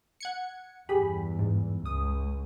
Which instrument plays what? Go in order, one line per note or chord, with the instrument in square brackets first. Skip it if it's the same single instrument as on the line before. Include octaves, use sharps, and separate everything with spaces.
[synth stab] F#5 G#6 C#7
[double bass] E2 G2 [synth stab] G4 G#4 B5
[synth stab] G#2
[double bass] C#2 [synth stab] D#6